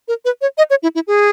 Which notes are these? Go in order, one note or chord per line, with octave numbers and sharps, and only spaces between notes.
A#4
B4
C#5
D#5
C#5
E4
E4
G#4